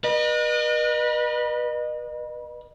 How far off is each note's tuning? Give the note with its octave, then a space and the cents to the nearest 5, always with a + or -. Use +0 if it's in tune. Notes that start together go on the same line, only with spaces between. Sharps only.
B4 -40 D#5 -35